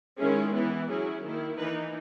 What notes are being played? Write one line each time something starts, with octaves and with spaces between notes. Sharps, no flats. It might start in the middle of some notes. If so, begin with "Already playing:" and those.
D#3 G#3 C#4 E4 G#4
E3 B3 E4
F#3 C#4 E4 G#4
D#3 A#3 E4
E3 A#3 D#4 B4